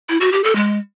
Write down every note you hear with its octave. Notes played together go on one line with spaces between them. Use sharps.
E4
F#4
G4
A4
G#3